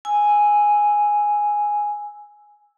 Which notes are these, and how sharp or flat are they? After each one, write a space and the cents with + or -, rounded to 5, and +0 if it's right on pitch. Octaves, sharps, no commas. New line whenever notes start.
G#5 +0 E6 +0